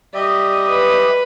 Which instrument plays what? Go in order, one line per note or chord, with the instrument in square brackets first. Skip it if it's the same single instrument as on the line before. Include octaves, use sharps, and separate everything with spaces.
[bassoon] G3 [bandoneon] G4 E5 [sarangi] D#5
[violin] B4